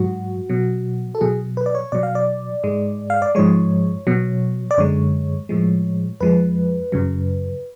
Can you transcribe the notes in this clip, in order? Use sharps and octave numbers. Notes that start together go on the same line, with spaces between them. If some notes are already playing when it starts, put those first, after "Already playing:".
Already playing: G#2 F#3 F#4
B2 F#3
A4
B2 F#3 G#4
B4
D5
C#5
B2 F#3 D5
F5
D5
G#2 G#3
F5
D5
G#2 F3 G#3 C#5
B2 F#3
D5
F#2 D3 G#3 C#5
A2 F3 G#3
F2 F3 G#3 B4
F#2 C#3 F#3